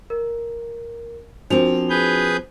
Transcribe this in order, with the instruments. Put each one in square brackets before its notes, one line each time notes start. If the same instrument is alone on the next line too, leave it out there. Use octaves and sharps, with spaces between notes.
[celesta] A#4
[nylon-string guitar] F3 A#3 C4 [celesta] D4 F#4 F7
[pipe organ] G#4 B4 G6